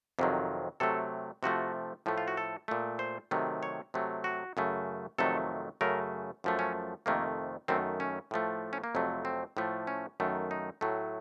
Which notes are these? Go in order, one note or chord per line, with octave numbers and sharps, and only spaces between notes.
F2 C3 D#3 F#3
C3 F#3 A3 A4
C3 F3 A3 F#4
A2 F3 A3
F4
F#4
A4
A#2 A3
C5
C3 D#3 F#3 A3
C#5
C3 F#3 A3
F#4
F#2 C#3 A3
F2 C3 D#3 F#3 A3 A4
F#2 C#3 A3 A#4
F#2 F3 A3
C#4
F2 C3 D#3 A3 A#3
F#2 D#3 A3 C4
C#4
A2 F3 A3
C#4
A#3
F2 C3 F#3 A3
C4
A2 F3 A3
C#4
F#2 D#3 A3
D#4
A2 F#3 A3